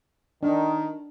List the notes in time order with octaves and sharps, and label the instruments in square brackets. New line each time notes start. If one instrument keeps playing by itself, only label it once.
[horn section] D#3 [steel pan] D4